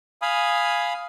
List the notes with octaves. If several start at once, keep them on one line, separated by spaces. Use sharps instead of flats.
F5 G#5 B5 D#6